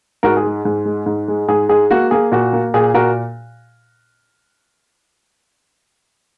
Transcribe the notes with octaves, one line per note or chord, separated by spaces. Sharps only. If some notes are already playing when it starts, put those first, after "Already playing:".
G#2 F#4 A#4
G#4
G#3
G#2
G#3
G#2
G#3
G#2 G#4
G#3 G#4
A#3 F#4
A#3 G#4
A#2 F#4
A#3
A#2 G#4
A#2 F#4 A#4